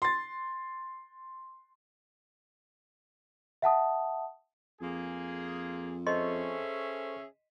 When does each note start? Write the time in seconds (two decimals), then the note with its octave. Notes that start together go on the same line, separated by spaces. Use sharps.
0.02 C6 A6
3.62 E5 F#5 A5 D#6
4.81 F2 A#3 F4 G#4
6.07 C#4 G#4 A4 C5 D#5 E5 C6 C#6